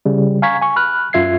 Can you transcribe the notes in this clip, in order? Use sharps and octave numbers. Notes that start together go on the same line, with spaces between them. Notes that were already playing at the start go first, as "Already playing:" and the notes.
C#3 G3
F5 G#5 A#5 C#6 G#6 B6
G#5 C#6
B5 F6 F#6
F#2 F4 E5 G#6 C7